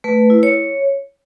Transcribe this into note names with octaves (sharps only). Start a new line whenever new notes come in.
A3 B4
E4
C#5